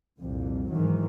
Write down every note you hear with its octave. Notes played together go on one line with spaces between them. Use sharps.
C2 F2 A#2
G#2 D#3 E3 F#3